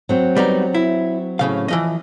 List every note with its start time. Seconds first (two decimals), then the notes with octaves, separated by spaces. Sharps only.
0.09 F#3 C4 F#4
0.37 G3 B3 D#4
0.74 E4
1.39 A2 C#3 F5
1.68 E3 F3 D#5